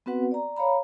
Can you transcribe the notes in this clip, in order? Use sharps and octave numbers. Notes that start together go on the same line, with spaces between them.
B3 C4 F#4 B4 F#5
D5 A#5
C#5 F5 A#5 B5